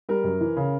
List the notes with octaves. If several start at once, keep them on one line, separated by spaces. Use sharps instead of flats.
G3 A#4
F#2
E3
C#3